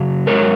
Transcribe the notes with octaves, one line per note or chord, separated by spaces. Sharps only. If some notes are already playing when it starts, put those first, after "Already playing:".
Already playing: F#2 C#3 F#3
G#2 F#3 A#4 C#5